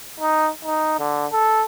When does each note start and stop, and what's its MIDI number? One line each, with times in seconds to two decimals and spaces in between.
0.20 0.50 63
0.65 0.95 63
0.99 1.27 50
1.32 1.65 69